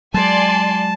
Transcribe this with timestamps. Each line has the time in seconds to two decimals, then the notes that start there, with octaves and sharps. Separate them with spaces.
0.14 F#3 G#3 D5 G#5 A5 C6